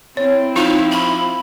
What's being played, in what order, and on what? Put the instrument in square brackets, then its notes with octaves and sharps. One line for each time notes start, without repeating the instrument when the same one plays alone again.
[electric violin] C4 E4 [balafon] C#5
[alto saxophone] F3 [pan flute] D#4 [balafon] F4
[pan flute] B5